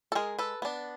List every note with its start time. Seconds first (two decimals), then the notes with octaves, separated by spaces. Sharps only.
0.12 A4
0.15 G#3 G#4 A#4
0.39 A4 B4
0.62 B3 D4